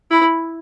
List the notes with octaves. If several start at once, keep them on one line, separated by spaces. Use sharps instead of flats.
E4